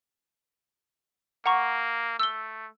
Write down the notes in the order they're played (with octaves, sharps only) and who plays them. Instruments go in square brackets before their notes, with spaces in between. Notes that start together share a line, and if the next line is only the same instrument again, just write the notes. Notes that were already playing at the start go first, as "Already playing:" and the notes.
[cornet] A#3 [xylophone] F#5 A#5 C#6
[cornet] A3 [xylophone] E6 G7